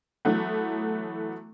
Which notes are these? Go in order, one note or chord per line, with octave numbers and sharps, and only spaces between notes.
E3 F#3 A3 B3